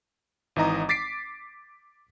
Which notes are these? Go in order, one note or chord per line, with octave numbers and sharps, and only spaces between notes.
G#1 E3 D#4 D#5 A#5 D#6
D6 A6 B6 C7 D7